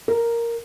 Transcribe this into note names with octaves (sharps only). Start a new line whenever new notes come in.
A#4